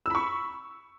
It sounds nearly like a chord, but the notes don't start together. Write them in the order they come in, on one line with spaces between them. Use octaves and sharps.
E6 B5 C#6